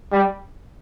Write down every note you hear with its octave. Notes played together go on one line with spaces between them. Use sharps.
G3